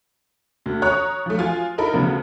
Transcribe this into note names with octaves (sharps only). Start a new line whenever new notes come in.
D2
C#5 A#5 C#6 D#6 F#6
F3 A3
F3 F4 G#5
D#4 E4 A4 A#4 B5
D2 C#3 F3 B3